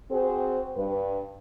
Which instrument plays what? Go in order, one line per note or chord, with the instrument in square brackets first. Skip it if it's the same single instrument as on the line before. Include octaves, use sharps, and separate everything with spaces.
[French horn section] C4 F#4 G#4 C5
G2 B4